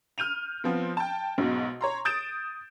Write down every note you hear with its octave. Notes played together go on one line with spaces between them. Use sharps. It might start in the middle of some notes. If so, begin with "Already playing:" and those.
F6 G6 D#7 F7
F3 B3 C4
G5 A5
B1 G#2 B2
C#5 A#5 C6
D#6 G6 A6 D7 E7